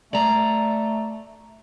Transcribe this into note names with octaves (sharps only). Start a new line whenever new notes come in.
A3 D5 A#5